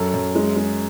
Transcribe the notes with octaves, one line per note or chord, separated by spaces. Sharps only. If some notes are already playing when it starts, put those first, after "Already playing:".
Already playing: F#2 A4
F#2
G#3
G#3